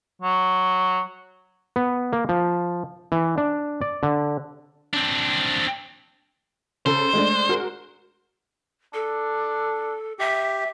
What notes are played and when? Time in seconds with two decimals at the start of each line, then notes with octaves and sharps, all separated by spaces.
0.22 F#3
1.76 B3
2.13 A#3
2.29 F3
3.12 E3
3.38 D4
3.81 D5
4.03 D3
4.94 C4 D4
6.86 C#3 A4 C5
7.13 G#3 A3 D4
7.49 F#4 G#4 A#4
8.94 D4 A4
10.19 G4 E5